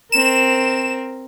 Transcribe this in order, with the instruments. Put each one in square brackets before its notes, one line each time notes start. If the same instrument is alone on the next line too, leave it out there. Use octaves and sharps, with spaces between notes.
[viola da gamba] C4 A#4 [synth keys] E7